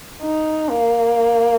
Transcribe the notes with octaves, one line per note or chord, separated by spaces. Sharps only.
D#4
A#3